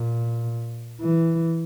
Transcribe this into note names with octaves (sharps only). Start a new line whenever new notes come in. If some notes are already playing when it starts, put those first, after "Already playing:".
Already playing: A#2
E3